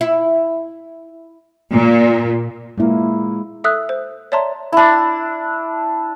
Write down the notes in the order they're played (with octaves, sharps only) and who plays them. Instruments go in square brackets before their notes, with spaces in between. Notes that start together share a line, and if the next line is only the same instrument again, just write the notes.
[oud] E4
[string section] A#2
[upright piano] A#2 A#3 [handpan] G#3 E4
[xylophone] A4 E5 D#6 E6 F#6
C5
C#5 D5 E5 A5 A#5 C6
[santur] D4 E4